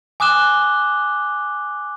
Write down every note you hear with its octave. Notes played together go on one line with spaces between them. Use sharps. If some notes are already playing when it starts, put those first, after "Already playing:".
G#5 D6 D#6 F#6 E7 G7